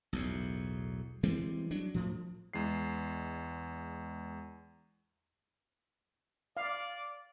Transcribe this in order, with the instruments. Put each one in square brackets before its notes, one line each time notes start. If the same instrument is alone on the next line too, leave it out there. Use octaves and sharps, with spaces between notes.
[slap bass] B1 E2 A2
E3 G3 G#3 C4
F#3 D4
A2 F3
[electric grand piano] E2 G#3 C7
[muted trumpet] D5 [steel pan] F5